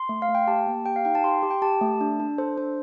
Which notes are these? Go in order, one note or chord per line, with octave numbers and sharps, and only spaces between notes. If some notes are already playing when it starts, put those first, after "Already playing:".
Already playing: C6
A3
F5
A3
G5
G4 A5
A#3
G4 G5
F5
D#4 G5
A5
G4 C6
G4
G5
G4 A5
A3
D4
D4
A4 C5
D4 C5